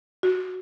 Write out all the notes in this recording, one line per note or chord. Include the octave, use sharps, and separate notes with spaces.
F#4